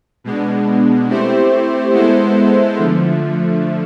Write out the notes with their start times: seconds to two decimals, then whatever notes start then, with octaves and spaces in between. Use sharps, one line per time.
0.24 B2 G#3 B3 D4
1.09 A3 C4 E4 G4 C5
1.93 G#3 B3 E4 A4 C5
2.78 D3 F3 A3